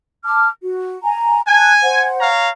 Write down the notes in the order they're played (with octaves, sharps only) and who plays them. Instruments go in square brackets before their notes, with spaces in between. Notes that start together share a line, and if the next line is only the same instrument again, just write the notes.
[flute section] A5 D6 F6
F#4
G#5 A#5
[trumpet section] G#5 [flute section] A5 F#6 G#6
[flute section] C5 F#5
[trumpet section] C#5 F5 A#5